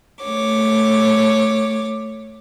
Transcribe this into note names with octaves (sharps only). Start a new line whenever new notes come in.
A3 C#5 D6